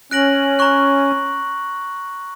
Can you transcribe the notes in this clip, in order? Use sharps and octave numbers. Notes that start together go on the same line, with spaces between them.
C#4 F#6 A#6 D7 F#7
A#5 C#6 F#6